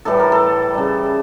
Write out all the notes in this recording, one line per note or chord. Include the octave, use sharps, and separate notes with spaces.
A2 E3 G3 A4
A#4
A4
C#3 G3